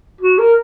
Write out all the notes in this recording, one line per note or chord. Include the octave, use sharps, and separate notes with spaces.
F#4
A#4